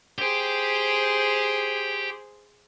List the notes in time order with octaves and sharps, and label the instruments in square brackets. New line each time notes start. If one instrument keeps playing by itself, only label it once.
[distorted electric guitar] G4 G5 [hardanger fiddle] G#4 C5